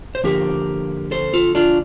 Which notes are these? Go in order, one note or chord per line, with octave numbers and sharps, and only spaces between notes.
C5
D3 F3 A#3 G4 A#4
A4 C5
F4 A4
D4 F4